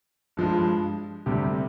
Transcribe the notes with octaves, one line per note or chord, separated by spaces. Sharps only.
G2 F3 G#3
D2 C3 G3 G4